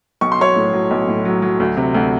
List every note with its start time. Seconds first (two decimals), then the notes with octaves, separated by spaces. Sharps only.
0.21 B1 C#6
0.32 C6
0.39 F#3 C#5 C#6
0.56 A2
0.73 F#3
0.91 B1
1.08 A2
1.25 F#3
1.42 F#3
1.60 D2
1.77 C3
1.94 D2